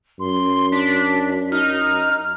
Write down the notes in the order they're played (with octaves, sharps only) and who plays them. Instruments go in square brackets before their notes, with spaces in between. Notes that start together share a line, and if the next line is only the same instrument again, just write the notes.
[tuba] F#2 [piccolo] C6
[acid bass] D4 [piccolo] B6
[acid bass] D#4 [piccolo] F6